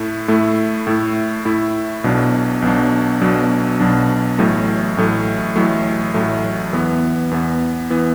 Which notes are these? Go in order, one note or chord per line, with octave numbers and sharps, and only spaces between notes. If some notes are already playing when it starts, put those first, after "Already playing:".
Already playing: A2 A3 E4
A2 A3 E4
A2 A3 E4
A2 A3 E4
B1 B2 F#3 D4
B1 B2 F#3 D4
B1 B2 F#3 D4
B1 B2 F#3 D4
A1 A2 F#3 A3
A1 A2 F#3 A3
A1 A2 F#3 A3
A1 A2 F#3 A3
E2 E3 B3
E2 E3 B3
E3 B3